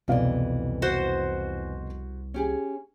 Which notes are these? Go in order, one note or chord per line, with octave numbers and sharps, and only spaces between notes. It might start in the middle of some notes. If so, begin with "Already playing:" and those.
F1 C2 F2 B2 E3 D5 F5
F#4 C5
C#4 G4 G#4